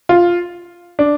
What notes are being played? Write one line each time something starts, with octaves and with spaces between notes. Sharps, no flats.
F4
D4